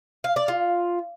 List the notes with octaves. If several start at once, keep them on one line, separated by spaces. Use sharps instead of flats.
F5
D5
F4